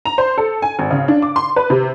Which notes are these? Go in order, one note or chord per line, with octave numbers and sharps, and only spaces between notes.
A#5
C5
A4
G#5
G#1
C#3
D4
D6
C6
B4
C3